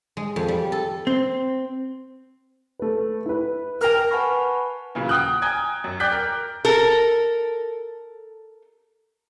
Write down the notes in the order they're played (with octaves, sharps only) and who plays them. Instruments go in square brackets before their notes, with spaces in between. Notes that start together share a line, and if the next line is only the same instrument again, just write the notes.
[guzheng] G#3
F2
G3
A4
[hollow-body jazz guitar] C4
[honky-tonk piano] A3 B4
E4 B4
[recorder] A#4 [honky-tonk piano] G5 F6
[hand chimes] B4 F#5 G#5 A5 B5 C#6
[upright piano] A#2 C#3 E3 F#3
F#5 G5 D#6 F6 F#6
G5 G#5 A#5 D#6 G#6
F#2
D5 G5 D6 F#6 G6 B6
A#4
[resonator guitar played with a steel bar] A4 A#4